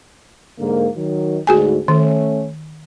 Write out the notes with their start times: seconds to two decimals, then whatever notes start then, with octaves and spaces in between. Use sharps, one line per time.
0.59 G#2 D3 A#3
0.97 D#3 F#3
1.47 D2 G#2 F#4 G#4 G#5
1.88 D#3 A3 C#4